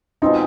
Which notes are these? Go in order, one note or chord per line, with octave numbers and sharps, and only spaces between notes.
B2 G#3 C4 D#4 F4